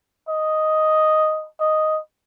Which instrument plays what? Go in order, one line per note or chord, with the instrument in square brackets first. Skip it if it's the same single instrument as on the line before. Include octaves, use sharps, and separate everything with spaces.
[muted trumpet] D#5
D#5